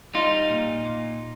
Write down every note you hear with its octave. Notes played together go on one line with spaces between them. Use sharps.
G3 D#4 F4
A#2
A#2